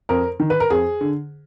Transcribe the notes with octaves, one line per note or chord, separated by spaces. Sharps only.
F2 A#4
D#3
B4
A#4
F2 G#4
D3